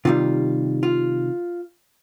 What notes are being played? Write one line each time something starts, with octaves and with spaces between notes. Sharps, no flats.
C3 D#3 G3 F4
F4